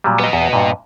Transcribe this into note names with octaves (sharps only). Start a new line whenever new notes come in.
A#2 F#3 G3
B3 D#5
E2 E5 A5
G2 A#2